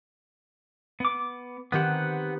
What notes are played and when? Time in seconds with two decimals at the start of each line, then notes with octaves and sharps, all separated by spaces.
1.00 B3 D6
1.72 D#3 B3 C4 G4 F#5